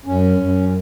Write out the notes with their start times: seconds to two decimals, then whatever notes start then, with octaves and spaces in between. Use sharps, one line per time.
0.05 F#2 C#4
0.37 F#2